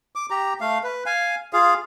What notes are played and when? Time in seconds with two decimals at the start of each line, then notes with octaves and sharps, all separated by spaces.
0.15 D6
0.30 G4 A#5
0.61 A3 F5
0.83 B4
1.06 F5 G#5
1.53 F4 G#4 F5